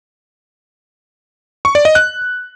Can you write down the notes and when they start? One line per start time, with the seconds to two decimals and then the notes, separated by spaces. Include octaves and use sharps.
1.65 C#6
1.75 D5
1.85 D#5
1.95 F#6